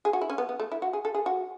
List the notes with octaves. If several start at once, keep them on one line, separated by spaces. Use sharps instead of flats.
G#4
F#4
E4
C#4
B3
B3
A3
E4
F#4
G#4
A4
G#4
F#4